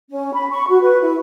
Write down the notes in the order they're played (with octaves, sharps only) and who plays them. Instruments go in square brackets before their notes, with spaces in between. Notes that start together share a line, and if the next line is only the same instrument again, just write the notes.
[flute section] C#4
B5
C#6
F#4
B4
E4